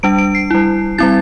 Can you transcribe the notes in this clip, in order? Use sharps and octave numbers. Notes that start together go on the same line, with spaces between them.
G3 D4 D7
D7
C7
G3 E4
G3 C4 E4 A6